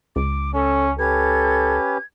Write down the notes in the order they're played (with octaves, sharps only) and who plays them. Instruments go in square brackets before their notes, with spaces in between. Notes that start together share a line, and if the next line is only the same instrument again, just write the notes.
[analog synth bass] C#2 [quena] D6
[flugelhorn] C#4 [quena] A4
[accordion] C#4 G4 B4 [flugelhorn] A4 [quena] G#6